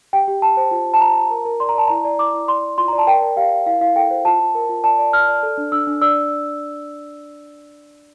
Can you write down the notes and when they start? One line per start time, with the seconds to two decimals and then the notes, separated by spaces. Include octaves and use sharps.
0.13 G4 G5
0.28 G4
0.42 G4 A5
0.57 C5
0.71 F4
0.86 F4
0.94 A5
1.01 F4 A#5
1.16 F4
1.31 A#4
1.45 A#4
1.60 D5 C6
1.69 A#5
1.75 D5 A5
1.88 E4 A#5
2.05 D5
2.19 E4 D6
2.34 E4
2.48 D5 C6
2.63 D5
2.78 F4 C6
2.88 A#5
2.93 D5
2.98 A5
3.07 A#4 G5
3.22 A#4
3.37 G4 F5
3.51 A#4
3.66 E4 F5
3.81 E4 F5
3.96 A4 G5
4.10 C5
4.25 F4 A5
4.39 F4
4.55 A#4
4.69 F4
4.84 D5 A5
4.99 D5
5.13 D5 F6
5.28 D5
5.43 A4
5.58 D4
5.72 D4 E6
5.87 D4
6.01 D5 E6